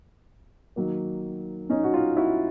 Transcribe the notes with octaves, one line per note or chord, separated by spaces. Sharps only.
D#3 F#3 A#3
C#4 D#4
F#4
D#4 F4
E4 F#4